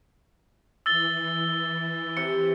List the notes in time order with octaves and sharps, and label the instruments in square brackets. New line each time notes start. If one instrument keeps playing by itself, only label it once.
[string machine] E3 [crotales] E6 A6 G7
[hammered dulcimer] C3 [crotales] C#7